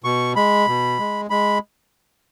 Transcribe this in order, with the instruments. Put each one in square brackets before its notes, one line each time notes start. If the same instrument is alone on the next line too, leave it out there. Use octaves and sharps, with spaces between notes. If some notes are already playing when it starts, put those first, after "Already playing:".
[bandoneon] B2 C#6
G#3 B5
B2
G#3
G#3 B5